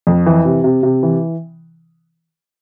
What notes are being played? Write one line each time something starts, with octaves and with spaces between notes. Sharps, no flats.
F2
E3
C3
C3
C3
E3